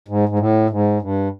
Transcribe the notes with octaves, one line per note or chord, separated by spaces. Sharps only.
G#2
G#2
A2
G#2
G2